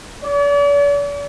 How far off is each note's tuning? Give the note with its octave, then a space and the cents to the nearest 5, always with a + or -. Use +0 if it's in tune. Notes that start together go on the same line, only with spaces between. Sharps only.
D5 -45